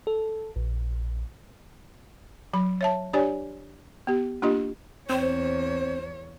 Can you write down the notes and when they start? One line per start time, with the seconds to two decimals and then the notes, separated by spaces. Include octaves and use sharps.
0.07 A4
0.56 A#1
2.53 F#3 B5
2.81 C#5 E5 A5
3.13 D4 G4 C#5 D5 G#5
4.07 B3 G4
4.42 A#3 D4 F4 G4 D#5
5.10 E2 C4 C5 C#5